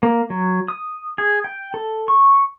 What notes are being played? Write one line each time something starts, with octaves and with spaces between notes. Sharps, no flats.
A#3
F#3
D#6
G#4
G5
A4
C#6